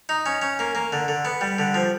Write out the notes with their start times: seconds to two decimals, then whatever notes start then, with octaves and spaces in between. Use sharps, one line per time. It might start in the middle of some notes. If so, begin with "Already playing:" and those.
0.09 D#4
0.26 C#4
0.42 C#4
0.59 A#3
0.75 A#3
0.92 D3
1.08 D3
1.25 B3
1.41 G3
1.58 D3
1.74 F3